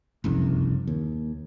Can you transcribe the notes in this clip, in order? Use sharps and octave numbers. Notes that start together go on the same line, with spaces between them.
F#1 C2 F2
D#2